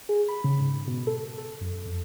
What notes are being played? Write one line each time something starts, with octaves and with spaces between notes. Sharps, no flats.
G#4
B5
C#3
G#2
B2
A4
A4
F#2
F2